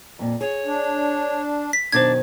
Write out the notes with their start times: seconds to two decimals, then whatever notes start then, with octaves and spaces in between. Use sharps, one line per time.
0.19 F2 A#2
0.41 G#4 C#5
0.66 D4
1.73 B6
1.92 F#2 B2 D#3 D4 C5 G#6